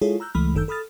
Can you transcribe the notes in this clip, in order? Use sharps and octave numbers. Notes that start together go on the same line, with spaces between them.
G#3 E4 F4 G#4 A4 C#5
A#5 E6 F#6 G6
C#2 E3 G#3 A3 B5 F6
G1 F#2 D#3 A4 E6 G6
A4 B5 D#6 F6 A6